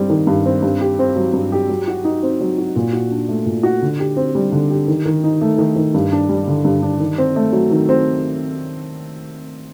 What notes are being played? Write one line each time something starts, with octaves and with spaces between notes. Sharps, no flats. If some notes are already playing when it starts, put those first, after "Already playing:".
Already playing: G2 G3 C4
D#3
G2
C4
G2
G4
C4
F#3
G2
G4
F#3
F#4
D#4
C4
F#3
F#4
A#2
F#4
D4
A3
A#2
F#4
D3
G4
C4
G3
D3
G4
D#3
D#3
D#4
A3
D#3
D#3
G2
D4
G3
D3
G2
D4
D#3
C4
A3
F#3
D#3
C4